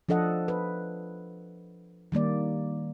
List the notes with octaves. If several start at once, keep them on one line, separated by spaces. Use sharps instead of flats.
F3 D4 A4 D#5 F#5
B4
D#3 G3 A#3 D5